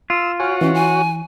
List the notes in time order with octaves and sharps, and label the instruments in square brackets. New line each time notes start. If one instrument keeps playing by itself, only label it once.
[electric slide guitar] F4 [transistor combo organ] E6
[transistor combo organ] F#4 C#5 [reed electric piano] G#5 F6
[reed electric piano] E3 [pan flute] C#4
[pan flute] G#5